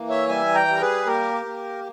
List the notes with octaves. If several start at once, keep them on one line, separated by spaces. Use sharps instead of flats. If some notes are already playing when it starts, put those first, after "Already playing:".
Already playing: E3 A#3
C#5 E5
G3 E5 G#5
G5 A#5
G3
A#4
G#4 B4
A#3 G4 A#4
A#3